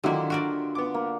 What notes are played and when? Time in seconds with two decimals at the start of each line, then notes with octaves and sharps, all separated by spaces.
0.04 D3 D#3 F#3 A#3 E4 F4 G4
0.30 F#4 A#4 D5
0.75 B3 D6
0.94 A#3